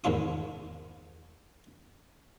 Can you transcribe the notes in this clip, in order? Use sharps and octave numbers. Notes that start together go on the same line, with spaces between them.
A1 E2 G#2 D#3 F4 D#6